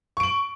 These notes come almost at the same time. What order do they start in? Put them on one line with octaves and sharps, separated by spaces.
C#6 D7 F#7